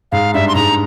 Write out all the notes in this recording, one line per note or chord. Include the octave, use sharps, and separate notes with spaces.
G#2 F5
G2 E5
C6
G#2 A#5